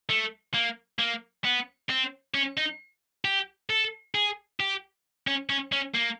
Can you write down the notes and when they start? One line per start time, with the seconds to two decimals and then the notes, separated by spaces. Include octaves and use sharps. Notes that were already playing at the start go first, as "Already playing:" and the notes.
0.10 A3
0.54 A#3
0.99 A#3
1.45 B3
1.90 C4
2.34 C#4
2.57 D#4
3.25 G4
3.70 A4
4.15 G#4
4.60 G4
5.27 C#4
5.50 C#4
5.72 C#4
5.95 A#3